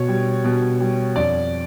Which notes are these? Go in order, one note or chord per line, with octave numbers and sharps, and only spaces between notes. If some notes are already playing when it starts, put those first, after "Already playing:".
Already playing: B2 C#5
G3
B2
G3
F2 D5